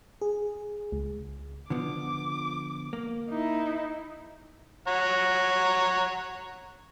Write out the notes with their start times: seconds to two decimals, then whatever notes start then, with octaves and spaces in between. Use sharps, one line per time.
0.21 G#4
0.92 C#2
1.70 D3 F3 B3 D6
2.93 A#3
3.29 D#4 E4
4.88 C#5 F#5 A#5